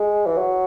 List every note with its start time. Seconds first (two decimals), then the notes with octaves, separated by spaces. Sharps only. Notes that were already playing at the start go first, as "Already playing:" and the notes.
Already playing: G#3
0.27 E3
0.38 F#3